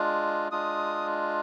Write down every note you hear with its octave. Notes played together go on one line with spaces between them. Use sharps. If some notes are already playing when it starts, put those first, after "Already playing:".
Already playing: G#3 D4 F4
G#3 D4 F4 D#6